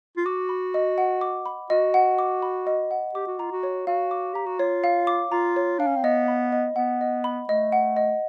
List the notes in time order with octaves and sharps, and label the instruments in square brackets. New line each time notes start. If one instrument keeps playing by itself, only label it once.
[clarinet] F4
[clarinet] F#4 [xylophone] D6
[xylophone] B5
D#5
F#5
D6
B5
[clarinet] F#4 [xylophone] D#5
[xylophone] F#5
D6
B5
D#5
F#5
[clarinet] G4 [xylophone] D6
[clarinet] F#4
[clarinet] F4 [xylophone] A#5
[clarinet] F#4
[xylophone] C#5
[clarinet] F#4 [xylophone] F5
[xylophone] D6
[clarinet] G4 [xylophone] A#5
[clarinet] F#4
[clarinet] F4 [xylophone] C#5
[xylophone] F5
D6
[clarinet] F4 [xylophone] A#5
[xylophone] C#5
[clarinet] D4 [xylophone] F5
[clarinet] C#4
C4
[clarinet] B3 [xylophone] D#5
[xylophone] B5
D#5
[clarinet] B3 [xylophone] F#5
[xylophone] D#5
B5
[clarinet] A3 [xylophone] D#5
[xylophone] F#5
D#5